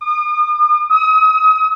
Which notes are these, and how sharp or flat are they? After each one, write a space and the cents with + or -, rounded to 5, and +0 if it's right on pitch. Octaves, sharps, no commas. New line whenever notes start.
D#6 -45
D#6 +35